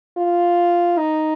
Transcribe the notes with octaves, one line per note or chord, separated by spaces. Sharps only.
F4
D#4